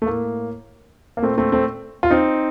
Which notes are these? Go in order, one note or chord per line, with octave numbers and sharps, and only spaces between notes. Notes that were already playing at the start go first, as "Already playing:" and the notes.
A3
A2 A#3
A#3
A#2 A3 C4
A3 C4
A3 C4
F4
C4 D#4